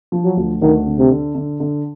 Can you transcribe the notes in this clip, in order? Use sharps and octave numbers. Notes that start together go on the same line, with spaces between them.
F3
F#3
D2
D2 D#3
D3
C3
D3
D3
D3